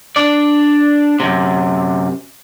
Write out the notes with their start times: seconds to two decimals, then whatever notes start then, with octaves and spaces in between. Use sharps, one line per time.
0.16 D4 D5
1.20 F#2 C3